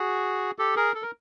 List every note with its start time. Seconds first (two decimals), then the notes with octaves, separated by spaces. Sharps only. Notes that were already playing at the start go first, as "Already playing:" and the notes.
Already playing: F#4 G#4
0.59 G4 A4
0.76 G#4 A#4
0.94 A4
1.03 A#4